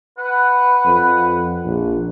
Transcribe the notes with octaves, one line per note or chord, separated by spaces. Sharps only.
B4 F#5
F2
A#1